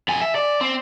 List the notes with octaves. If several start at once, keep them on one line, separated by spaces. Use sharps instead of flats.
F2 G#5
E5
D5
C4